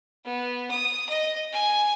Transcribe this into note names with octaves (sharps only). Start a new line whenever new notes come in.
B3
D#6
D#5
G#5